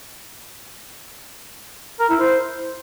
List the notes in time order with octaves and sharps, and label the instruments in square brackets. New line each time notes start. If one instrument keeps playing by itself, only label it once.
[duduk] A#4
E4
C5